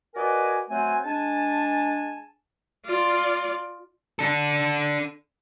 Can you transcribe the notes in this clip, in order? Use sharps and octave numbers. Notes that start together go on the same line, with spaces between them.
F#4 A#4 B4 D5 D#5 G#5
F#3 A3 C4 C5 F#5 G#5
G#3 D4 G#5 A5
F4 D5
D4 A4